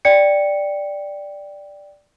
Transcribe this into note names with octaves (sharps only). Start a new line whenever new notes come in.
D5 G5 C#7